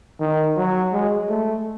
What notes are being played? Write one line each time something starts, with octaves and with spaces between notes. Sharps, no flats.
D#3
F#3
G#3
A3